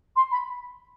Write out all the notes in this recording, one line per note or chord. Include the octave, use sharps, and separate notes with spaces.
C6
B5